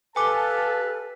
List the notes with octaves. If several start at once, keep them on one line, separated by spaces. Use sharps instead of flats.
G4 A4 B4 F5 G#5 A5 D6